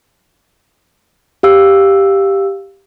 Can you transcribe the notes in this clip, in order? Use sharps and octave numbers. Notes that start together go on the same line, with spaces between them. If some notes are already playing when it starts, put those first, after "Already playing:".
G4 F5 E6